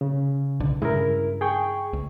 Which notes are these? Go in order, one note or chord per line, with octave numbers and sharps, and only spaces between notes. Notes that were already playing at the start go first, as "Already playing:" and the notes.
C#3
B1 D3
G2 C#3 G#3 E4 A#4
G#4 G5 C#6
C#2